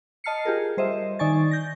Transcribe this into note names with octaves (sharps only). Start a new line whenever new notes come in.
D#5 A5 F6 C7 C#7
F4 G4 G#4 A#4
G3 C5 D#5 E5
D#3 D#4 D5 G#5 C#6 A6
G6 A#6